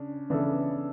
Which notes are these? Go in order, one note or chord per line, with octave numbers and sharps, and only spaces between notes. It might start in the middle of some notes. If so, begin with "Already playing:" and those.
Already playing: C#3 D4
C#3 E3 B3 D4 A4